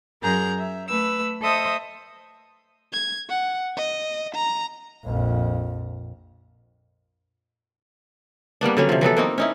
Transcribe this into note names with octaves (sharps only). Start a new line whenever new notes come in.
F#2 G#4 A#4 A#5 G6
E5
A3 B4 E6
A4 C5 D#5 E5 D#6
G#6
F#5
D#5
A#5
A#1 F2
G3 A#3 B3 D4
D3 F#3 C#4
C3 F3
E3 F#3 B3 A4
A#3 C4 D#4
C#4 D#4 E4